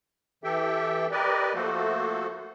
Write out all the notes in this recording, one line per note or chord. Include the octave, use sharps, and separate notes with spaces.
E3 G4 A4 E5 G5
G4 A#4 B4 D5 D#5
F3 A3 A#3 F#4 A4 C5